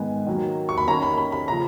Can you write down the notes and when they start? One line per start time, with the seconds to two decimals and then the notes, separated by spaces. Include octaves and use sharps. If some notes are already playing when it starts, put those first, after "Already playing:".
Already playing: G#2 D#3 G#3 B3 G#5
0.27 D#3 F#3 A#3
0.69 C#6
0.78 B5
0.87 D#3 A#3 C#4 A#5
1.03 B5
1.18 B5
1.32 B5
1.48 C#3 F3 A#5